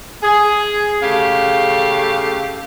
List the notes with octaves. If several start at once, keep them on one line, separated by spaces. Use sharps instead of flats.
G#4
C#3 A3 G4 F5